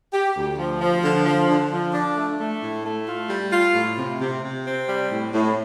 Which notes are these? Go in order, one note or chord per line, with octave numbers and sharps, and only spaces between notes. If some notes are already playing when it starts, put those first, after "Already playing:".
G4
D2
F3
F3
D3
F3
D3
F3
D4
A3
A3
A2
A3
F4
G3
F4
A2
C3
C3
C3
C4
G3
A2
A2